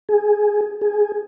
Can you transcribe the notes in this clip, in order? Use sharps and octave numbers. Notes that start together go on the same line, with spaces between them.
G#4
G#4